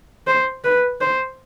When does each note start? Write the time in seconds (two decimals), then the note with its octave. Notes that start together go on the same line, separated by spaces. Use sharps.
0.27 C5
0.64 B4
1.01 C5